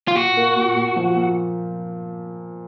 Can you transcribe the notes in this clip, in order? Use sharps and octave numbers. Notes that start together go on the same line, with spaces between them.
F4
A#2 F#4
A#3
A#2
A#2
F3
A#2